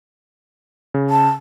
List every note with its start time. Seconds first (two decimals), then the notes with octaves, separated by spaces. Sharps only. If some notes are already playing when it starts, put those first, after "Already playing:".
0.94 C#3
1.10 A5